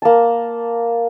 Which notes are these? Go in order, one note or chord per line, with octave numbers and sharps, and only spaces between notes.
A#3 A5